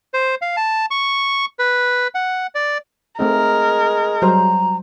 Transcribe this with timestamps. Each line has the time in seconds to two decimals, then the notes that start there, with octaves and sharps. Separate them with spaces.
0.14 C5
0.42 F5
0.57 A5
0.91 C#6
1.59 B4
2.15 F#5
2.55 D5
3.19 G#3 A3 C4 D#4 A#4
4.22 F#3 G3 C5 A#5